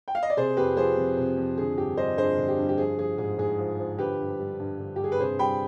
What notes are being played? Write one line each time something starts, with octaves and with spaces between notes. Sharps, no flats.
G5
F5
D#5
D5
C3 G#4 C5
F2 G4 B4
F3 G#4 C5
F2
C3
F2
D3 G#4
G2 G4
G3 C5 D#5
G2 G#4 C5
D3
G4
G2
G4
F3 G#4
F3 G#4
G#2 G#4
G#2 G#4
F3
F3
D3 G4 B4
G2
G3
G2
D3
G4
G2 G#4
B4
C3 G#4 C5
G3 G5 B5